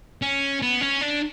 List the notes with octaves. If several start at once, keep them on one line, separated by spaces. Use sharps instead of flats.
C#4
B3
C#4
D4